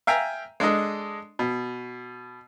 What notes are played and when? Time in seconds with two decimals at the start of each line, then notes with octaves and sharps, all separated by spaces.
0.07 E5 F5 G5 G#5 A#5
0.60 G#3 D4 A4 D#5
1.39 B2